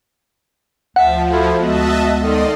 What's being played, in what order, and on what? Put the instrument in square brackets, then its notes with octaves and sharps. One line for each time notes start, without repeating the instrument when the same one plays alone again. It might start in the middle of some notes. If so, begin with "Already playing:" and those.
[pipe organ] D2 [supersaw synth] F3 [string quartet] E5 A5 [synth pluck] F#5
[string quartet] E4 F#4 A4
[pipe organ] D2 G#3 B3 [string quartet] F#4 [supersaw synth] D#5 E5 A5
[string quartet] D#3 A4 [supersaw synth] D5 D#5 C6